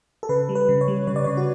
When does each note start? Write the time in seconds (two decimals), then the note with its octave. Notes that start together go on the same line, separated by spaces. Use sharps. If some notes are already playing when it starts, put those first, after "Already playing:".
0.23 A4
0.29 C#3 B4
0.49 G3
0.55 B4
0.69 C#3
0.81 C#5
0.88 G3
1.07 C#3 C#5
1.16 D5
1.24 C#3 C#5
1.37 F#4